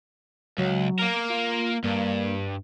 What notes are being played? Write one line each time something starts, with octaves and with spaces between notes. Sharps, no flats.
C#2 F#3
A#3 A#4
F4
G2 A#3